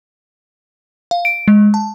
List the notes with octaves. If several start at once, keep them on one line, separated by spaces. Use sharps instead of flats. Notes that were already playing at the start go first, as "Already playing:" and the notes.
F5
D7
G#3
A5